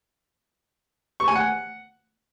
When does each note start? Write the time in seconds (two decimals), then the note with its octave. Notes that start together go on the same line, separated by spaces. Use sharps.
1.20 C#6
1.28 G#5
1.35 F#5